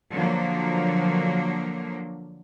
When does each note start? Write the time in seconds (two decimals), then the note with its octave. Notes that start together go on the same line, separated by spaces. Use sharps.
0.11 D3 F3 F#3 A#3